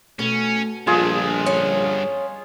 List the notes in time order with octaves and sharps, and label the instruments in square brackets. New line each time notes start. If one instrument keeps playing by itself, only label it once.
[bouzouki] B2 [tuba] A3 [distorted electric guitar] C#4
[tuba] A#1 [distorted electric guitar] G2 D3 [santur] F4 G#4 D#5
[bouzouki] C#4